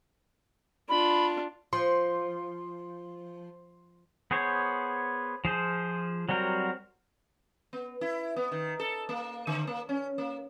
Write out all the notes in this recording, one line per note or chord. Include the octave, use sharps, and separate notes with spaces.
D4 F4 B5
F3 C6
B3 G#4 C5 C#5
F3 G#4 C5
F#3 G3 C4 F#4 A#4
B3
E4
B3
D#3
A4
A#3
D3
A#3
C#4
A#3